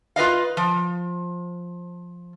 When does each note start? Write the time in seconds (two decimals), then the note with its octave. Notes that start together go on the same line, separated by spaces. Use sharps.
0.16 F4 B4 D#5 F5
0.57 F3